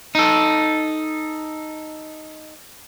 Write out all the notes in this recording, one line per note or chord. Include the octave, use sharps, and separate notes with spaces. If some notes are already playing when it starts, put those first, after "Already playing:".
D#4 A4